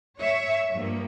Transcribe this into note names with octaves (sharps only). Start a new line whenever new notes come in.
C#5 E5
G2 F3 A#3